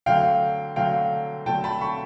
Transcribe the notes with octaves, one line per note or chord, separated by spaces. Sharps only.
D3 F#3 A3 F5 G5
D3 F#3 A3 F5 G5
D3 F#3 A3 G5 A5
A5 B5
B5 C#6